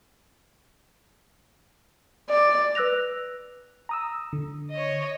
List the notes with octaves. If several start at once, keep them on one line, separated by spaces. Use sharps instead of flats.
D5
B4 E6 F#6 A#6 F7
A#5 D#6 E6
D3
C#5 D#5